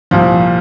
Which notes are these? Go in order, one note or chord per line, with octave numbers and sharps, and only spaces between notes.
C2 A#2 F3